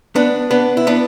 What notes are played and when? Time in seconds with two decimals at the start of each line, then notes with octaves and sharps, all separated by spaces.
0.16 B3 D4
0.51 B3 D4
0.77 E4
0.87 B3 D4